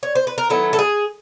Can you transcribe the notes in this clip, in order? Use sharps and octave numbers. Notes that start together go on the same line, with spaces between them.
C#5
C5
B4
A#4
D#3 F#3 B3 E4 A4
A4
G#4